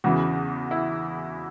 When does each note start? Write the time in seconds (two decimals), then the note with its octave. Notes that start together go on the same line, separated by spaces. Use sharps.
0.04 E2 C#3 E3 F#4
0.71 E4